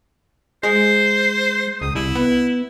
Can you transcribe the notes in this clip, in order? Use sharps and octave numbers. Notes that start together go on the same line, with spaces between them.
G#3 C5
C#2 D#6
C2 E4
B3